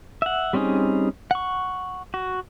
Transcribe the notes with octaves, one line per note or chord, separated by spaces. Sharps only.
E5 F#5
G3 C4 C#4 D#4 G#4
F#5 C#6
F#4